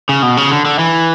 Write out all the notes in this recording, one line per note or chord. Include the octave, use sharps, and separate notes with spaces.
C#3
B2
C#3
D3
D3
E3